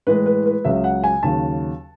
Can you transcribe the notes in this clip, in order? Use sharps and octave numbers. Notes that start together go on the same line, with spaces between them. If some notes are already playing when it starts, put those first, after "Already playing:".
A2 E3 G#3 B4
B4
B4
C#2 C#3 F#3 E5
F#5
G#5
D#2 C#3 F#3 A5